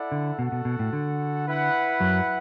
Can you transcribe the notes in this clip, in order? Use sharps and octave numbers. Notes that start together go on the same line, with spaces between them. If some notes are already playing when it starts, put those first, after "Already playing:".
Already playing: E4 A4 D5 F#5
D3
B2 F#4 A4 F#5
B2
B2
A2
D3
E4 B4 F#5
F#2 F#3